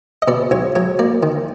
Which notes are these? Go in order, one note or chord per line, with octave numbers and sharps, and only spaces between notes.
D#5
B2 D5
B1 C#5
F#3 C#5
A#3 D5
D#3